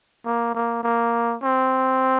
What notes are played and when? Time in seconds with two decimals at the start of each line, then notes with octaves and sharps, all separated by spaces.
0.25 A#3
0.54 A#3
0.83 A#3
1.43 C4